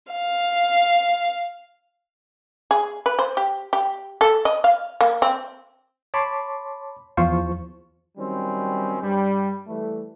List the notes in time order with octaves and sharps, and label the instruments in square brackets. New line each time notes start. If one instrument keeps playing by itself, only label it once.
[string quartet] F5
[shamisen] G#4
B4
C5
G4
G4
A4
D#5
F5
A#3
C4
[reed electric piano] C#5 A5 B5 C6 D6
E2 F3 F4 C5 C#6
[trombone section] D#3 F#3 G3 C4 C#4
G2 G3
E3 G3 A3